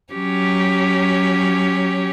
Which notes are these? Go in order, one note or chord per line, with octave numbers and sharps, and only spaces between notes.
F#3 C#4 G4 C#5